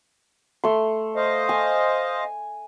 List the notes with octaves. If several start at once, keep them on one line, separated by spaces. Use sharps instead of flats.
A3 C6
C5 D#5 F5
G#5